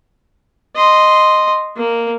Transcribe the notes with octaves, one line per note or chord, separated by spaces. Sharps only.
D#5 C6
A#3